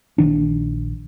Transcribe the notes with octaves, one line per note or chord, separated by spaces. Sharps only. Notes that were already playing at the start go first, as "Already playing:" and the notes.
A#1 D#3 D4